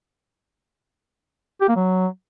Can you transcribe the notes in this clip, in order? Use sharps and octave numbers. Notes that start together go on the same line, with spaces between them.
G4
A#3
F#3